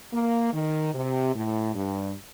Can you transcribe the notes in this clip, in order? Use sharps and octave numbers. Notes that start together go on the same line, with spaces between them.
A#3
D#3
C3
A2
G2